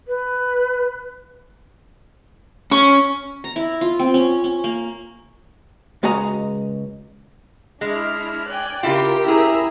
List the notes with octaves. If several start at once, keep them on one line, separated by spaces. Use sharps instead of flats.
B4
C#4 C#6
A#5
E4
F4
C4
C#4
C#4
A#3
C#2 G#3 F#4 D#5 A#5
G#3 D4 E4 F6
D5 G5 G#5 F#6
C#3 E4 F4 G4 A#4 C6
C#4 E4 G#4 E5 A#5 E6